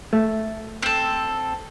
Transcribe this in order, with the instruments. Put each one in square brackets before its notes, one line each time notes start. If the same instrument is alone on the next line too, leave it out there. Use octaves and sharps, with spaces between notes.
[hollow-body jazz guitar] A3
[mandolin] C4 A4